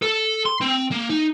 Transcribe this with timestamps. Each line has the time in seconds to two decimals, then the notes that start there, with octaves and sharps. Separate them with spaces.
0.02 A4
0.46 C6
0.62 C4
0.91 A#3
1.10 D#4